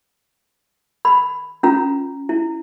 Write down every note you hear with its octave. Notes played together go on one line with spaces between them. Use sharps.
B5
C#4 F4 A#5
E4